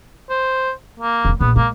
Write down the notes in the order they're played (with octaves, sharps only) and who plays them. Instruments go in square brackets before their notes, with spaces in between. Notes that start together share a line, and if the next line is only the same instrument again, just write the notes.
[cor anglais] C5
A#3
[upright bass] E1 C#3
[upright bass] A#1 [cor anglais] B3
[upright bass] G#3 [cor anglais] A#3